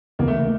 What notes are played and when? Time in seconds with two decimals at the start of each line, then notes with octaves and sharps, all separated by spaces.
0.19 D#2 C#3 E3 G#3 A#3 B3
0.28 A3
0.37 A#3